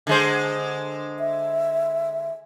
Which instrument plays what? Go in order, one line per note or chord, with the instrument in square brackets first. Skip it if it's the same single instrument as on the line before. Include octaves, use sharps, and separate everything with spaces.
[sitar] D3 G#3 C5
[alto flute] E5